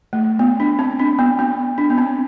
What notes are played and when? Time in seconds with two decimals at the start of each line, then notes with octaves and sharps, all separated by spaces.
0.13 A3
0.39 B3
0.60 D4
0.79 C4
0.99 D4
1.19 B3
1.39 B3
1.78 D4
1.90 B3
1.98 C4